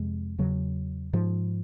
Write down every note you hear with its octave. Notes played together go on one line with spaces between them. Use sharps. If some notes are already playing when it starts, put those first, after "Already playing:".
Already playing: F2 C3 G#3
E2 C#3 F#3
G#2 F3